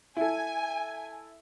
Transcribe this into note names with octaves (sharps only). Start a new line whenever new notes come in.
E4 A4 G#5